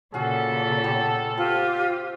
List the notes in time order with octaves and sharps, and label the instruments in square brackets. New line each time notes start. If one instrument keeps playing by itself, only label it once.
[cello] A#2 C#3 [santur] C#4 F#4 [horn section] A4
[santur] B3 G4 C#5
[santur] C4 [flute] F4 [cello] G4